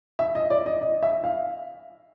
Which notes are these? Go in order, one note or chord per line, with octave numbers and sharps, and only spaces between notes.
E5
D#5
D5
D#5
D#5
E5
F5